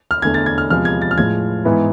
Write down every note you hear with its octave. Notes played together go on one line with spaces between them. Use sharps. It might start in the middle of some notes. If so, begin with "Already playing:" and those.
F6
E2 D3 A3 G#6
A6
G#6
F6
E2 C3 F3 G#3 F6
G#6
A6
F6
A2 F3 G#3 G#6
G#2 E3 B3 E4